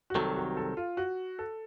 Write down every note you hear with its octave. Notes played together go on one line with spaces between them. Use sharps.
F#4
C2 C3 D#3 F#3 A4
F#4
A4
F4
F#4
A4